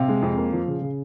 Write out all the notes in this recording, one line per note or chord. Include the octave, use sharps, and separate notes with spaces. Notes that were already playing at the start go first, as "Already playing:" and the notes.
Already playing: C3 F5
G#3
F2
A#3
F3
C#3
C#3